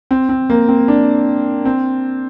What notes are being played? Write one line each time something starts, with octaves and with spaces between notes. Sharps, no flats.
C4
C4
A#3
C4
D4
C4